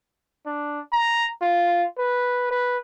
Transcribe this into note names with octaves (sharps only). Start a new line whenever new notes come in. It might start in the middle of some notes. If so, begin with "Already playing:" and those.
D4
A#5
F4
B4
B4